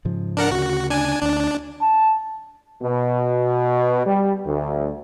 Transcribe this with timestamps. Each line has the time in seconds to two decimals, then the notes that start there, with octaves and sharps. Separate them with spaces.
0.05 G#2 C#3 F3
0.37 D4 A#4 F#5
0.51 D2 C#3 F#4
0.90 D4 G#5
1.22 D2 D4
1.81 A5
2.82 B2
4.07 G3
4.46 D2